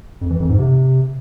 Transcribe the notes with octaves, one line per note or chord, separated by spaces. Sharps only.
F2
E3
F2
G#2
C3